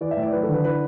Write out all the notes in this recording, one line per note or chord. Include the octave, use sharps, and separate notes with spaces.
E3 D5
E5
A2
D5
F#3 B4
A4
D3
B4
E3 B4